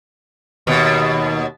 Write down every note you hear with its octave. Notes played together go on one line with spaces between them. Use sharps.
D#2 B2